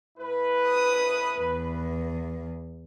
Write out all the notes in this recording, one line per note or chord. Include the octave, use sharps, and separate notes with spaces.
A2 E4 B4
D#6
E2